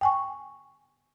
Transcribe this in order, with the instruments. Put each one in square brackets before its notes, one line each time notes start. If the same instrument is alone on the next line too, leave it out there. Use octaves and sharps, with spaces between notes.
[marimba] G5 G#5 C#6